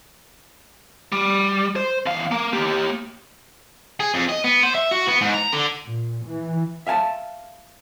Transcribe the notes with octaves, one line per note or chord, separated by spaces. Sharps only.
G3
C5
E2 F5
A#3
A#3 G4
G#4
F2
D#5
B3
C5
E5
F#4
B3
G#2
A#5
D3
A#2
E3
E5 F5 G#5 A5